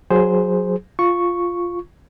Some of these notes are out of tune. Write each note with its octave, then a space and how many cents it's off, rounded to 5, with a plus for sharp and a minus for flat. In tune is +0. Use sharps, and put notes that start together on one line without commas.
F#3 -15 G#4 +0 C5 +0
F4 +0 C#6 +0